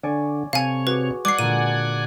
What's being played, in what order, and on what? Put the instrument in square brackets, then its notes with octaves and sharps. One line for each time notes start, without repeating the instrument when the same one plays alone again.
[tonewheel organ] D3 [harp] C#5 D5 G#5
[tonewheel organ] C3 C#5 [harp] A4 [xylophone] F5 G#5
[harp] F#4 G#4 D6 [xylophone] B4
[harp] G#3 [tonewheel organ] D5 F#5 G#5 [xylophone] D6 C7
[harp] A#2 D3 [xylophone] D#7